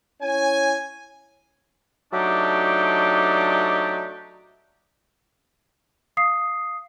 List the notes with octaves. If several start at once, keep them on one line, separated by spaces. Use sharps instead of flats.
C#4 E4 C#5 G#5
F#3 A3 D4 D#4 G4 D5
F5 D#6 C7